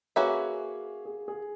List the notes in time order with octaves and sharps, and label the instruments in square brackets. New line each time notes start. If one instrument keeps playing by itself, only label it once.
[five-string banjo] A#3 C#4 F#4 B4 E5 [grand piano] G#4
[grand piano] G#4
G#4